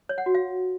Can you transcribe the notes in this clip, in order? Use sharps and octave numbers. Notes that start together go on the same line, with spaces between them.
C#5
F#5
F#4
F5